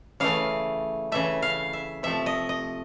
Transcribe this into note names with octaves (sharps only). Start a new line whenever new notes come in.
C#3 E3 A3 F5
C#3 E3 A3 E5
F5
E5
C3 F3 A3 E5
D#5
D#5